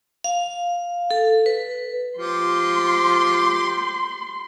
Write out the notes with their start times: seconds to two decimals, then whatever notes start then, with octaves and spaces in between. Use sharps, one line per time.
0.24 F5
1.11 A4
1.46 B4
2.18 F3 G4 C6